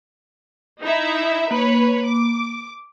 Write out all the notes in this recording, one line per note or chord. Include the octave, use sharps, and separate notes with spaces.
D#4 E4 E5
A#3 B4 C#5
D6